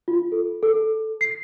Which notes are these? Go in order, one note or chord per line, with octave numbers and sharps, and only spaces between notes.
F4
A4
A4
C7